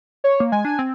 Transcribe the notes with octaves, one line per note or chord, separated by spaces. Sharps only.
C#5
A#3
G#3 G#5
D4
C4